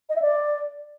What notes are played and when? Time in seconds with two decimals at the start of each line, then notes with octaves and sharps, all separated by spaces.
0.09 D#5
0.16 E5
0.22 D5